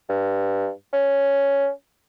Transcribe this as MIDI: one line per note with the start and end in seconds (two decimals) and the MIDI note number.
0.09 0.70 43
0.93 1.68 61